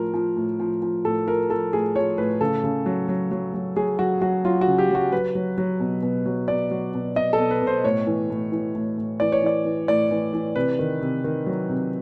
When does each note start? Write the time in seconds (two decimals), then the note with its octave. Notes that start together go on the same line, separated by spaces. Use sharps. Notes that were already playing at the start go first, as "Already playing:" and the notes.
Already playing: A2 F3 A#4
0.14 F3
0.36 A2
0.60 F3
0.82 F3
1.05 A2 A4
1.27 F3 A#4
1.50 F3 A4
1.72 A2 G#4
1.96 F3 C#5
2.18 A2 B4
2.41 C#3 A4
2.64 C#3
2.86 F#3
3.09 F#3
3.31 F#3
3.54 F#3
3.76 F#3 G#4
3.99 F#3 F#4
4.21 F#3 F#4
4.45 F#3 F4
4.61 F#4
4.67 C#3
4.78 G4
4.90 F#3 F#4
5.12 F#3 B4
5.35 F#3
5.58 F#3
5.80 B2
6.02 B2
6.26 F#3
6.48 B2 D5
6.71 F#3
6.94 B2
7.16 B2 D#5
7.33 A4
7.39 B2
7.51 B4
7.62 B2
7.67 C5
7.84 A2 C#5
8.07 E3
8.30 A2
8.52 E3
8.75 A2
8.98 A2
9.20 E3 D5
9.32 C#5
9.42 E3 D5
9.65 E3
9.88 A2 D5
10.11 E3
10.33 E3
10.56 C3 B4
10.79 D#3
11.01 C3
11.24 D#3
11.46 F#3
11.69 C3